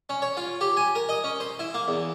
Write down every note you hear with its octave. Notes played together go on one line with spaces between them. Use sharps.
C#4
C#5
F4
G4
G#5
A#4
D#5
C#4
C5
E4
A#3
E2